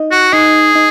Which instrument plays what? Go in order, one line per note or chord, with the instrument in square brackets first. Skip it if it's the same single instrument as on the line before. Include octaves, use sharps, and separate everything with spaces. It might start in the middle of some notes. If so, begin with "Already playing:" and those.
Already playing: [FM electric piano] D#4 D#5
[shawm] F#4
[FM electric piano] D#4 D#5 [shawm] G#4
[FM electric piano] D#4 D#5